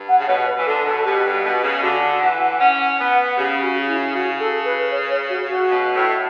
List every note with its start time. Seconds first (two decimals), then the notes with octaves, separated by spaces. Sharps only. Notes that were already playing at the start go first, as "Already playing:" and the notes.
Already playing: G2
0.09 F#5
0.17 C#3
0.28 B2 C#5
0.47 B4
0.58 E3
0.66 D3 A4
0.85 B2 A4
1.05 B2 G4
1.24 G2
1.44 B2
1.63 C#3
1.82 D3 F#4
2.21 E3 F#5
2.40 F#5
2.60 C#4 F#5
2.99 B3
3.11 F#5
3.37 C#3 G4
3.62 F#4
3.88 E4
4.14 C#3 F#4
4.40 A4
4.65 B4
4.92 C#5
5.11 C#5
5.29 F#4
5.49 F#4
5.68 B2
5.95 A2